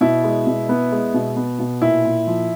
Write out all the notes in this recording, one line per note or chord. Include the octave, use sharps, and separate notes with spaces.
B2 E4
G#3
B2
B3
G#3
B2
B3
B2
A#2 E4
A#2
F3